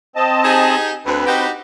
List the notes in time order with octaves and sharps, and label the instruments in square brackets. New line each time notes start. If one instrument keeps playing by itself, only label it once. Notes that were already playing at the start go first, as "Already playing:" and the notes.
[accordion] C4 D#5 A5
[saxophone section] D#4 G4 G#4
[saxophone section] D2 [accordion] C4 B4
[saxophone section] D#4 F#4 G4